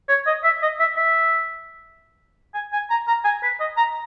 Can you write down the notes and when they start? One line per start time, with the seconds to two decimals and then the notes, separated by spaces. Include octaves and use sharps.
0.09 C#5
0.27 D#5
0.44 E5
0.62 D#5
0.80 E5
0.97 E5
2.54 G#5
2.73 G#5
2.90 A#5
3.08 A#5
3.25 G#5
3.43 B4
3.60 D#5
3.77 A#5